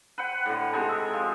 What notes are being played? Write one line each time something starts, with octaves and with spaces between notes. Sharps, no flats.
B4 C5 F#5 G5
A2 D3
C3 G#3 D#4 A5
E5
F3